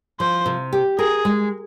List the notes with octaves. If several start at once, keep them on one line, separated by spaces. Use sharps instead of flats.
F3 C5
C3
G4
G#4 A#4
G#3